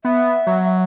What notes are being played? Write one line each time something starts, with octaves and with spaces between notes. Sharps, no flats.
B3 E5
F#3